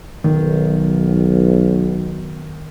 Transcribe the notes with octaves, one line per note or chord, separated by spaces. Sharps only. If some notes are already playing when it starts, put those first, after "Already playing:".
B1 D#3